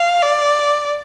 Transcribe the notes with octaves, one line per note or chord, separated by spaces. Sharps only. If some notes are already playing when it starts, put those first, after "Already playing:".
Already playing: F5
D5